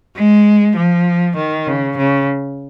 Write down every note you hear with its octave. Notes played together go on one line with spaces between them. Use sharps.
G#3
F3
D#3
C#3
C#3